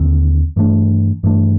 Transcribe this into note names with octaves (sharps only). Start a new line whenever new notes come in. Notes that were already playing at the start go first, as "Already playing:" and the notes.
Already playing: D#2 D3 C4
G2 E3 A3 D4
G2 E3 A3 D4